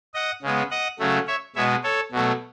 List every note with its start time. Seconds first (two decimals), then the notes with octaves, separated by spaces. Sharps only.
0.14 D#5 F#5
0.43 C#3 G#3 B3
0.71 D#5 F#5
0.99 C#3 F#3 A3
1.27 C#5 E5
1.56 B2 G#3 B3 C#5 E5
1.83 A4 C#5
2.12 B2 F#3 A3